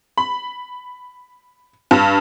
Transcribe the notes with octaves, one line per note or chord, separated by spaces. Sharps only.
B5
G2